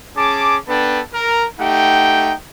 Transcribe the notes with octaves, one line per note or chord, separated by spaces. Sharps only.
C#4 G#4 A5 D6
B3 D4 A4 B4 G5 A5
A#4
A3 D#4 G4 F#5 G5